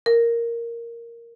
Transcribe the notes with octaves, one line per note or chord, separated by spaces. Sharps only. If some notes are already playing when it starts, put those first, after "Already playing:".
A#4